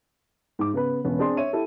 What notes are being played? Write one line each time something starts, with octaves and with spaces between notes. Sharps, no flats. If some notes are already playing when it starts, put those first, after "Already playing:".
G#2 D6
C#3 B3 B4
E1 B3 C#4
C4 D4 G#4 D5 C6
C#5 E5 D#7
E4 G4 A4